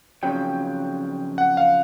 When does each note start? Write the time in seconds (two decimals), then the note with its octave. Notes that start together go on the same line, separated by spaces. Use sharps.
0.23 F2 C#3 F#3 G5
1.38 F#5
1.57 F5